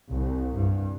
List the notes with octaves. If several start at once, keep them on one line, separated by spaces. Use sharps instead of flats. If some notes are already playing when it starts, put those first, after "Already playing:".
C2
G2